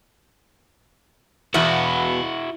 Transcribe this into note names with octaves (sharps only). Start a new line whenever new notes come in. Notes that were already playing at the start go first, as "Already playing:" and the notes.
E2 B2 E4 F#4